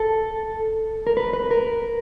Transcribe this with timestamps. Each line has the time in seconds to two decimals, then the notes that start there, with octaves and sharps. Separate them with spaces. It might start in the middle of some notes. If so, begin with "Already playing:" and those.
Already playing: A4
1.07 A#4
1.17 B4
1.33 B4
1.51 A#4